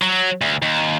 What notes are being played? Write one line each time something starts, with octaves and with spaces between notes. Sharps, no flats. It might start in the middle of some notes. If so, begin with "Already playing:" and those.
F#3
D2
D#2